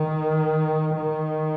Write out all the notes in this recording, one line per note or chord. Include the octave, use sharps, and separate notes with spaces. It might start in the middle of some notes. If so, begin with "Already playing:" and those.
Already playing: D#3
D#3